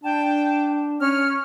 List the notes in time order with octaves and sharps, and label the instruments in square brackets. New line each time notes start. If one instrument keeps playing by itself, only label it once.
[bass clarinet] D4 [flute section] G5 A5
[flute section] C#4 F6